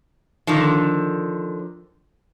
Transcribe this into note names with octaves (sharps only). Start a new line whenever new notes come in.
D3 D#3 F3